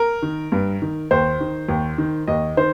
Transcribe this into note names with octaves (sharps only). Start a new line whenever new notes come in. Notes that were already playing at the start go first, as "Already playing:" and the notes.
Already playing: A#4
D#3
G2
D#3
D#2 C5
D#3
D#2
D#3
D#2 D#5
D#3 C5